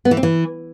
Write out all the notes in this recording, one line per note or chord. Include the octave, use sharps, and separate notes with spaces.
B3
E3
C4
E3